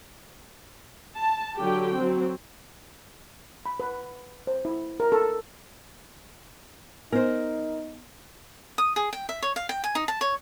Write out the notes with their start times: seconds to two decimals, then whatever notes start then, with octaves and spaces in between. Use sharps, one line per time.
1.17 A5
1.60 D3 F#3 G4 G5
1.96 F#3 C4
3.66 B5
3.80 B4
4.47 C5
4.65 E4
5.00 A#4
5.12 A4
7.12 B3 D#4 A#4 C5
8.78 D#6
8.96 G#4
9.13 G5
9.29 E5
9.43 C#5
9.56 F5
9.69 G5
9.84 G#5
9.95 D#4
10.08 A5
10.21 C#5